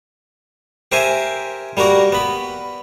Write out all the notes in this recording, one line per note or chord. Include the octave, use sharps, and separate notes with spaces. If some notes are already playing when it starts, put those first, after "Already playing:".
G4 A#4 C5 E5 G#5
G3 A#3 F#4 A#4
B3 B5